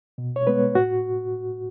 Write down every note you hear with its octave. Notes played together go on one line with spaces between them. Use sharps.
B2
C#5
G#3 B3 B4
A2 F#4